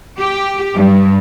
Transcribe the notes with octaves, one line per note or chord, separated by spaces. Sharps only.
G4
G2